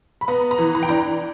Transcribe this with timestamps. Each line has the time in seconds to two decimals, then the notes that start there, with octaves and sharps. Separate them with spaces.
0.21 B5
0.28 B3 A#5
0.51 A#5
0.59 E3
0.75 A#5
0.83 G5
0.89 D4 A#5